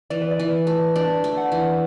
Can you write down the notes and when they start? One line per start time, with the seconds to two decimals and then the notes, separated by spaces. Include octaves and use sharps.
0.10 E3 D5
0.22 B4
0.31 D5
0.40 E3
0.67 A3
0.96 D4 D5
1.24 A3
1.37 F#5
1.52 E3